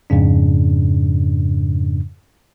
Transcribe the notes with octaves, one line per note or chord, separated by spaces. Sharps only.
F2 G#2 C#3 D4